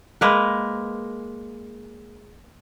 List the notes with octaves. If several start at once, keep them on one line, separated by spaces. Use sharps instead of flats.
G#3 A#3 B4